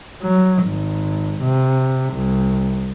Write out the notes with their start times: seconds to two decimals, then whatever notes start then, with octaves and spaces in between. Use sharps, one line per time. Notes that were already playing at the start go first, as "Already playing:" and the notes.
0.22 F#3
0.64 G#1
1.42 C3
2.13 C2